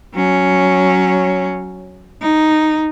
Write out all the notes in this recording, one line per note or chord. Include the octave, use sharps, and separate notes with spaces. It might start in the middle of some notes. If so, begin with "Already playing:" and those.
F#3 C#4
D#4